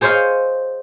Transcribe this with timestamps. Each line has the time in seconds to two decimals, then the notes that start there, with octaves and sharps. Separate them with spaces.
0.01 G#4 C5 C#5 D#5 F5